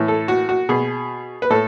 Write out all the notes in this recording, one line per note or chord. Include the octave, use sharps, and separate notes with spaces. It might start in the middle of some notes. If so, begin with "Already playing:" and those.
Already playing: A2 E3
A4
F#4
F#4
B2 G#4
B4
A2 A4